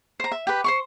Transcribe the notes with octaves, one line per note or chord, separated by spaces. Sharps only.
C5 A#5
E5
G4 B4
C5 C6 C#6